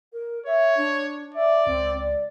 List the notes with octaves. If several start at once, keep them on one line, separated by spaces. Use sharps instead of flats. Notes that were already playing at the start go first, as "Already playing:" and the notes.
A#4
C#5 E5
D4
D5 E5
C#2 C4
D5